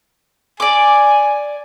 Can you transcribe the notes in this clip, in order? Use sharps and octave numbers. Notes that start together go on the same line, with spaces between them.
D5 G#5 D6